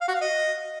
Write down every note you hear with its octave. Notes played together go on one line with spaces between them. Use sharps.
F5
F#4
F5
D#5